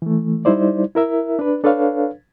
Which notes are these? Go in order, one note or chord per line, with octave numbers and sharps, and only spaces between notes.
E3 A3
G3 D#4 E4 C5 D5
E4 A#4 E5
D4 B4
D4 A4 B4 C#5 F5